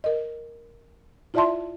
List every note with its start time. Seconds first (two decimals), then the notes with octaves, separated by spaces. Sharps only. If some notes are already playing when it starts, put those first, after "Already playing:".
0.04 A#4 D#5
1.34 E4 F4 D5 E5 A5 C6